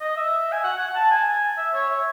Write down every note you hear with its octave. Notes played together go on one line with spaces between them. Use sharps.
D#5
E5
G#5
F#5
F#5
A5
G#5
E5
C#5
E5